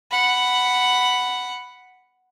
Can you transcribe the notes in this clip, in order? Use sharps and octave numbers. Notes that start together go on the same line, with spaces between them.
F#5 B5